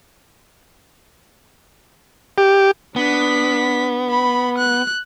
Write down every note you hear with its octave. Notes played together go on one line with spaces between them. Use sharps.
G4
B3 D4 B6
B5
F#6